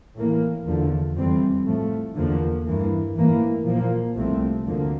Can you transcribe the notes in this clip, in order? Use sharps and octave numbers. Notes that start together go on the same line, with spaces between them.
A2 E3 A#3
E2 D3 F3
F2 E3 G3 C4
A2 F3 A3
E2 D3 F3 A#3
G2 E3 A#3
A2 E3 A#3
A#2 F3 A#3
C2 C3 F3 A3 C4
D2 D3 F3 A#3